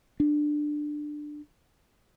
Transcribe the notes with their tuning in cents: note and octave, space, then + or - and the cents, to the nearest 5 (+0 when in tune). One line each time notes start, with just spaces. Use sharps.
D4 +15